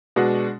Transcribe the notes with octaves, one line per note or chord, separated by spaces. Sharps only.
B2 G#3 D4 F#4